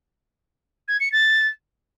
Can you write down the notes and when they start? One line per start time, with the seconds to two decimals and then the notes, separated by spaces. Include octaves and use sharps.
0.88 G#6
1.00 C#7
1.12 A6